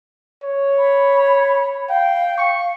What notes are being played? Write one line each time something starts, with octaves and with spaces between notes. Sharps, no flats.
C#5
B5
F5 G5
C#6